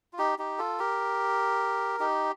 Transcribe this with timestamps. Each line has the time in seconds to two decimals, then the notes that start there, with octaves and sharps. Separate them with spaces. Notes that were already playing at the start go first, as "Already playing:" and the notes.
0.13 F4
0.18 D#4 G4
0.38 D#4 G4
0.58 F4 A4
0.79 G4 A#4
1.99 D#4 G4